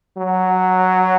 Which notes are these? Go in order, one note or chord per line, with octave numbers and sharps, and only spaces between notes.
F#3